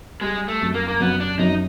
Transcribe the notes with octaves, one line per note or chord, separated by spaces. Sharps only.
G3 G#3
A3
F#2
A#3
A#3
F#2 B3
D4
F#2 D#4